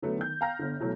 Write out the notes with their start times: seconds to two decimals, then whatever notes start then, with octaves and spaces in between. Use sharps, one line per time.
0.02 D3 F#3 A3 B3
0.18 D#3 G6
0.41 F5 G5 A#5 F6 A#6
0.59 G1 D3
0.80 B1 B2 E3 F#3 A3